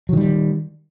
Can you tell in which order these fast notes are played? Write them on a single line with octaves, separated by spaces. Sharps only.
F#3 D#3 G3